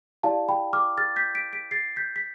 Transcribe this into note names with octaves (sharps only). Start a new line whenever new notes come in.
E4 G4 D5 F5 A5
G5 B5
D6 F6
F6 A6
G6 B6
B6 D7
B6 D7
A6 C7
G6 B6
B6